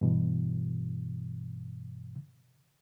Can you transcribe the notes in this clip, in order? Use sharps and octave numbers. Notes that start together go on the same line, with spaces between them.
G2 B2 E3